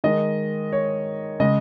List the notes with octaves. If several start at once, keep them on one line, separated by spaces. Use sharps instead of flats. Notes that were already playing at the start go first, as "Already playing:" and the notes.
D#3 G#3 D#5
C#5
C#3 G#3 D#5